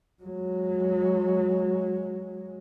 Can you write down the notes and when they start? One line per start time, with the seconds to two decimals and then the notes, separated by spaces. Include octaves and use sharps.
0.23 F#3 G#3